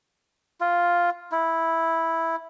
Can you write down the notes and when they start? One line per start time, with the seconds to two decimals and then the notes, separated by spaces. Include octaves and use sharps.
0.61 F4
1.32 E4